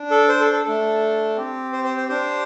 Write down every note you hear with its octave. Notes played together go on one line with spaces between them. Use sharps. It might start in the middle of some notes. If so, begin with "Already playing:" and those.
Already playing: D4
A4
C5
A4
A4
A3 D4 A4
C4 G4
C5
C5
C5
D4 G4 C5